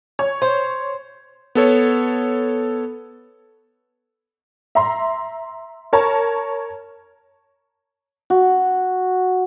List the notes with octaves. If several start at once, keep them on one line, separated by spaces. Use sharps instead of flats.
C#5
C5
B3 A4 C#5
E5 A#5 C6
A#4 C#5 A5 A#5
F#4